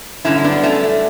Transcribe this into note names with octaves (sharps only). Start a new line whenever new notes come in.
G2 D3 F#3 C#4 E4
E4
B3 D4
A3 C#4
A3